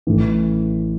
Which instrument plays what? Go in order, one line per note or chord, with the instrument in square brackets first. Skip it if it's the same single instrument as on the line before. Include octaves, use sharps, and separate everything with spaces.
[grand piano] A1 A2 E3